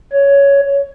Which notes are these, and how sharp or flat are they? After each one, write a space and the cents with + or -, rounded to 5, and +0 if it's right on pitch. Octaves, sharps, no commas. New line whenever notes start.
C#5 +10